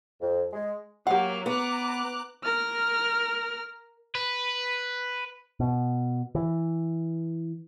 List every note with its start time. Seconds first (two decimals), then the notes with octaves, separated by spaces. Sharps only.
0.21 F2
0.53 G#3
1.07 F#3 A#3 G4 F5 F#5
1.46 B3 A#5 D6 F#6
2.44 A#4 F6
4.15 B4
5.60 B2
6.35 E3